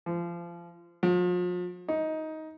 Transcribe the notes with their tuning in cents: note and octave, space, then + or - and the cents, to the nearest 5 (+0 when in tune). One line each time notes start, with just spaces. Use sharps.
F3 -25
F3 +40
D#4 +15